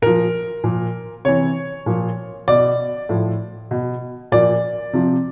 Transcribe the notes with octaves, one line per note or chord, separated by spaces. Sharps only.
A#2 F3 A#4
A#2 F3
C3 E3 C#5
A#2 F3
B2 D5
A2 F3
B2
A#2 F3 D5
C3 F3